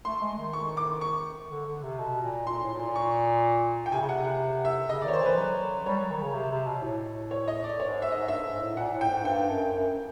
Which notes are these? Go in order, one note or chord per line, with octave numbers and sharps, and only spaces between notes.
A3 C6
G#3
D#3
C#6
D6
C#6
D3
D3
C3
B2
A#2
A#2 C6
A2
A2
A#2
C#6
G5
C3 G#5
C#3
C3 F#5
F#5
E5
C#3 D#5
D5
D#3 C#5
C5
E3 B4
F#3 B4
G3 C#5
F#3
D#3
C#3
C3
C3
B2
A2
C#5
D#5
D5
G#2 C#5
E5
D#5
G#2
G2 E5
G#2
A2
A#2 F#5
A2
G5
G#2
G2 G5
F#2
F#2